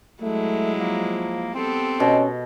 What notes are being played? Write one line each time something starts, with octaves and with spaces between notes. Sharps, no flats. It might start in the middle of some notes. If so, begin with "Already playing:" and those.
F#3 G#3 A3 E4
F3 A#3
B3 C4 G4 A4
B2 C#4